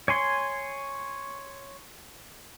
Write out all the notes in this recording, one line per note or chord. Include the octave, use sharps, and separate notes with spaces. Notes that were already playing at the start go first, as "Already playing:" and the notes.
C#5 G#5 C6